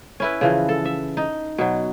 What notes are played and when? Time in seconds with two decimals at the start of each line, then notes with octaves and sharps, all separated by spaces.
0.20 C#4 E4 B4
0.41 C#3 E3 F3
0.69 A4
0.85 E5
1.17 D#4
1.58 B2 F#3